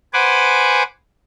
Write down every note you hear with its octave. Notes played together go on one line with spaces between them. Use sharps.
B4 C5 F#5 G#5 D6